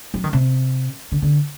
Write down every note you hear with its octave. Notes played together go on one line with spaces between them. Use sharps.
F#3
D#3
C3
D3
D3